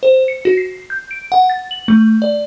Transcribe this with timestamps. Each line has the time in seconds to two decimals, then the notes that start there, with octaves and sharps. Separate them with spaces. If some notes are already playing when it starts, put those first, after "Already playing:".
0.03 C5
0.28 C#7
0.45 F#4
0.57 C7
0.90 G6
1.11 D7
1.32 F#5
1.50 A6
1.71 F#7
1.88 A3
2.22 D5